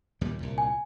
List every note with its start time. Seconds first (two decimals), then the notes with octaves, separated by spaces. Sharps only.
0.21 D#2 A#2 G3
0.40 C2 A#2
0.58 G#5